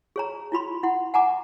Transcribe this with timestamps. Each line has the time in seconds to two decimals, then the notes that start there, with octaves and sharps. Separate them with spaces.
0.16 G#4 C#5 A#5
0.52 E4 F4 B5 C6
0.83 E4 F#5 C6
1.14 F#5 G#5 A#5 D6